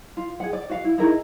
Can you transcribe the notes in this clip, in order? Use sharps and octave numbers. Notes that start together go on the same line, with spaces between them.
F4
G#4 F#5
D5
F#4 F5
E4
D#4 E4 G#4 A#4